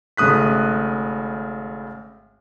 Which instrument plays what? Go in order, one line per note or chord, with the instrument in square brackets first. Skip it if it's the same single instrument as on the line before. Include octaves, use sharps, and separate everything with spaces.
[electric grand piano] G#1 C#3 A3 D#6 F#6 B6